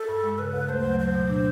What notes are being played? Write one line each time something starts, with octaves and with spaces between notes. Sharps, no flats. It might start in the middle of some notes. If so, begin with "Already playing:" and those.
Already playing: A4
G2
G#3
C#3 B4
D2
A3 C5
F#3
F#3 C5
B2
D4